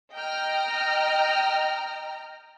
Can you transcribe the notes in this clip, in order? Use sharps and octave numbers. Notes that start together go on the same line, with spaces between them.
D#5 G5 A#5 F6